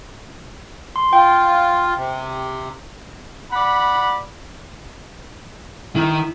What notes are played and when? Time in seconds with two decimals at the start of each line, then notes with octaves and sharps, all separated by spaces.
0.96 C6
1.13 F4 G5
1.95 C3
3.52 D5 F#5 B5
5.96 D#3 E4